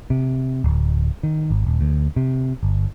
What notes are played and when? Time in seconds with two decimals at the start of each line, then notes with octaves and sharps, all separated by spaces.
0.10 C3
0.64 D1
1.23 D#3
1.50 G#1
1.66 D#1
1.81 D2
2.16 C3
2.63 G1